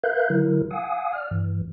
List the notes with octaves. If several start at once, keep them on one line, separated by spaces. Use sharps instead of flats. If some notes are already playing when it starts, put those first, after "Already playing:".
A#4 B4 E5 F5 F#6 G6
D3 F#3 E4 A#4
F5 F#5 G#5 D#6
D5 F6
G2 E3